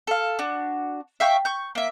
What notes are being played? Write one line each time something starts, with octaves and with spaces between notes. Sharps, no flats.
A4 F5
D4 F#4
E5 F5 G5 C#6
C#6 G6
A#3 E5